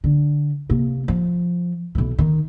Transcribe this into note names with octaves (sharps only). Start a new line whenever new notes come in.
D3
C3 A#3
F3
B1 E3
D#3